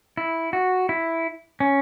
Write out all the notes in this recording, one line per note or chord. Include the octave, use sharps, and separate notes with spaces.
E4
F#4
E4
C#4